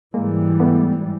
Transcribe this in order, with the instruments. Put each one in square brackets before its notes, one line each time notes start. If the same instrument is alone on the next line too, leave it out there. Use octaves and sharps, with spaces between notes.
[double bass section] G#2 E3 G3 [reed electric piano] G#3 A#3
[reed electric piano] A3 B3